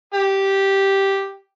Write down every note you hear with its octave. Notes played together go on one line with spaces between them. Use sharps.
G4